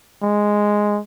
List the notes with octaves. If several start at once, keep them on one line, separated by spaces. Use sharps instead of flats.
G#3